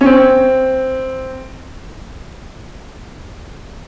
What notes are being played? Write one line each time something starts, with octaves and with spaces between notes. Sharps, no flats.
C#4
C4